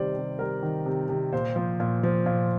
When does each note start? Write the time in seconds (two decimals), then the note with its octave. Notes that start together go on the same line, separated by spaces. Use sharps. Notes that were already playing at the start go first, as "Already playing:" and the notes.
Already playing: C3 D#3 G3 C5 D5
0.16 C3
0.39 G3 A#4
0.63 D#3
0.86 C3
1.09 C3
1.32 A#2 C5
1.56 F3
1.80 A#2
2.03 F3
2.26 A#2